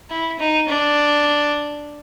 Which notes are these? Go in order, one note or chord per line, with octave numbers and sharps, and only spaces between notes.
E4
D#4
D4